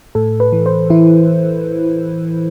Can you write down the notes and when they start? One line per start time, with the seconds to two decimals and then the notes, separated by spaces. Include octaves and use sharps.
0.15 A2 A4
0.40 B4
0.53 E3
0.66 C5
0.90 E3 E4